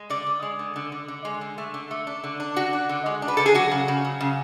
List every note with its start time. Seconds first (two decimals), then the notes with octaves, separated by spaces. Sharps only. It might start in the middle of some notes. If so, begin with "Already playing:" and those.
Already playing: G#3
0.10 D3 D5
0.26 D3
0.42 G#3
0.59 D3
0.76 D3
0.92 D3
1.08 D3
1.25 G#3
1.41 D3
1.58 A3
1.74 D3
1.91 A3
2.07 D4
2.24 D3
2.40 D4
2.56 D3 F#4
2.73 D4
2.89 D3
3.06 G#3
3.22 D4
3.28 B4
3.37 D3 A4
3.46 G#4
3.54 F#3 F#4
3.71 C#3
3.88 C#3
4.05 F#3
4.21 C#3